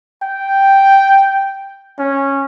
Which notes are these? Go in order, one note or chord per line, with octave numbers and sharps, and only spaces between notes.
G5
C#4